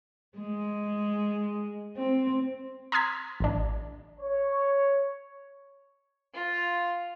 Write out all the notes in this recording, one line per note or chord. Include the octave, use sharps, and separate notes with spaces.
G#3
C4
A#5 C6 D#6 F6 G#6 B6
A1 D4
C#5
F4